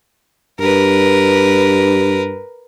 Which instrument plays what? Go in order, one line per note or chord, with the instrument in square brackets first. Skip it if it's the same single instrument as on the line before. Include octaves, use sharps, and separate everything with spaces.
[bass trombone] G2 [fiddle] A#4 B4